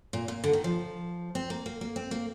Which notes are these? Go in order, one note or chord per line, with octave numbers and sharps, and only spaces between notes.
A#2
A#2
D3
D#3
F3
C4
A#3
A#3
A#3
C4
A#3